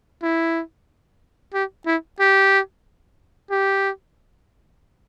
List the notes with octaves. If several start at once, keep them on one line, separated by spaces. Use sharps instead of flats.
E4
G4
E4
G4
G4